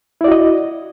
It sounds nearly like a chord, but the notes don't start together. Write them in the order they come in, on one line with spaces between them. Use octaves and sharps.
E4 D5 F#4 D#5